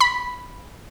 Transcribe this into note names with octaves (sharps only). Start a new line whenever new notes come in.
B5